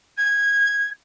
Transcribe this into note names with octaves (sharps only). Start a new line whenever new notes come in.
G#6